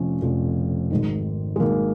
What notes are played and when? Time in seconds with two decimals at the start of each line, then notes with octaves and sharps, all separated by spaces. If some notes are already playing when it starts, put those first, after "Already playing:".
Already playing: F1 F2 F3 C#4
0.21 F1 F2 F3
0.90 G#1 G#2 D#3
1.56 G#3
1.60 G#1 G#2 D#3 A#3